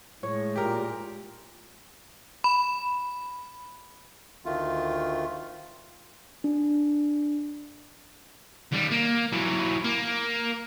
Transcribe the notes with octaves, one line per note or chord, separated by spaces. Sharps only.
A2 G#3 C#5
A#2 G4 A#4
B5
D2 D#3 A3 F4
D4
D#2 G3
A#3
E3 F#3
A#3